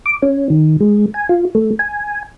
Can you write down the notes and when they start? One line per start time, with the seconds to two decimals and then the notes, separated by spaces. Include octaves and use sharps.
0.06 D6
0.22 C#4
0.50 D#3
0.80 G#3
1.14 G#5
1.29 F4
1.55 A3
1.79 G#5